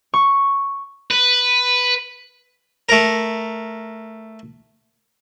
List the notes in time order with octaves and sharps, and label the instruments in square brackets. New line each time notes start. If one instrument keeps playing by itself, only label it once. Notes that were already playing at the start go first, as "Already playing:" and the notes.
[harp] C#6
[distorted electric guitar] B4
[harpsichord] A3 A#4